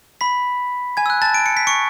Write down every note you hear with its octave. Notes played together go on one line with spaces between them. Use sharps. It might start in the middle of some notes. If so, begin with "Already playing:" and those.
B5 B6
G#5 G#6
E6
F#6
A5 A6
D7
C#7
B6
C#6 C#7